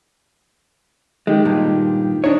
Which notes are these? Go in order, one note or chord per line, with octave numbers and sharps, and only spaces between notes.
D#3 G#3 G4
G2 A#2
D4 D#4 C#5